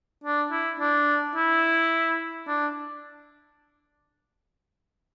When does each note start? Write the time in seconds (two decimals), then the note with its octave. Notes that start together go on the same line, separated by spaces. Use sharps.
0.24 D4
0.51 E4
0.79 D4
1.36 E4
2.47 D4